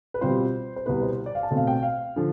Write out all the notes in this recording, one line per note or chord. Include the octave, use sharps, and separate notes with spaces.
B4
B2 G3 C4 F4 C5
C5
C2 B2 B3 E4 B4
C5
D5
F5
A5
B2 A3 C4
F5
G5
F5
D3 F3